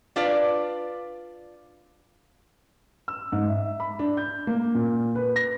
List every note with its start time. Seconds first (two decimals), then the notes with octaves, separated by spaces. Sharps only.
0.16 D4 F4 B4 D5
3.08 E6
3.32 G#2
3.48 E5
3.80 B5
3.99 D4
4.17 G6
4.47 A#3
4.75 A#2
5.15 B4
5.36 A#6